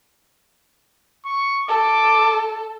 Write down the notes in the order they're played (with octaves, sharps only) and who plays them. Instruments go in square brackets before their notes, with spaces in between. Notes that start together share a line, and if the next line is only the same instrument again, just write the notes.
[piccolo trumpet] C#6
[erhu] A4 [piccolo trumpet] D6